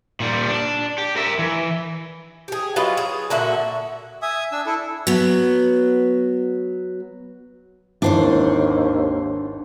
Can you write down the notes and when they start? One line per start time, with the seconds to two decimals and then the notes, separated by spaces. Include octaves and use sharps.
0.20 A#2 G3
0.48 D4
0.98 G4
1.16 A#4 E5
1.39 E3
2.48 G4 G#4
2.76 F#3 F4 B4 D#5
2.97 G#4
3.30 A#2 D3 F#4 E5
4.22 E5 G#5 D#6
4.52 D4 E6
4.66 E4 A4
5.07 F#3 B3
8.02 G#1 D#2 E3 D4 C5 C#5